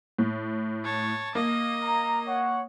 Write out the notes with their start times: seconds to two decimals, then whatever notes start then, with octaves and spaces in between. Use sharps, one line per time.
0.19 A2
0.84 C#5 A5
1.35 A#3 D#5
1.83 A#5
2.27 C#5 F#5